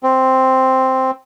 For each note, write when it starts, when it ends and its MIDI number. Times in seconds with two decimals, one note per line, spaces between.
0.03 1.11 60